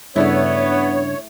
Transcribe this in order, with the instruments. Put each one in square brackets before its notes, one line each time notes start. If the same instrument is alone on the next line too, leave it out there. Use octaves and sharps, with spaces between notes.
[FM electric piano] G2 C#3 D4 [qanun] A3 E4 [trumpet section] B3 [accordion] C#5